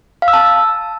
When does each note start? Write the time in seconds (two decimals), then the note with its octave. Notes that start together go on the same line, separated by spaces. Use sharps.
0.22 F5
0.28 E6
0.33 A5